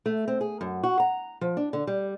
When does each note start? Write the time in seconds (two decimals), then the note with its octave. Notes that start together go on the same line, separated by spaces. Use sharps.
0.06 A3
0.28 C4
0.41 G#4
0.61 F#2
0.83 F#4
1.00 A#5
1.41 F3
1.57 D4
1.73 D3
1.87 G3